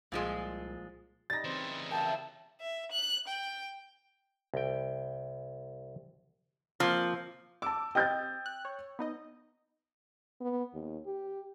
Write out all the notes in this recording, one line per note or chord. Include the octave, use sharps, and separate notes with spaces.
C2 A#2 F3 G#3
G3 D#4 A6 A#6
C#3 E3 C4
A#3 E5 G5 A5
E5
F#6
G5
C2 G5
F3 A#3 C4
A5 D6 E6
C4 G4 D#5 G5 G6 A6
F#6
C#5
B3 D#4 D#5
B3
D#2
G4